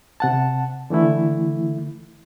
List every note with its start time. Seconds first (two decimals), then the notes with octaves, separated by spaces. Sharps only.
0.20 C3 F#5 A5
0.90 D3 E3 A3 E4